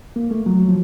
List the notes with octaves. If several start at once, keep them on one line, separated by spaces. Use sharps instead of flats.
A#3
A3
F#3
F3